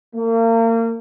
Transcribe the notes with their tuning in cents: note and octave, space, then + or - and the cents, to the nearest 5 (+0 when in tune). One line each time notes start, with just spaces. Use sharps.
A#3 -35